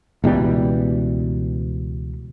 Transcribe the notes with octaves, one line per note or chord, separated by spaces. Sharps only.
C#2 B2 E3 G3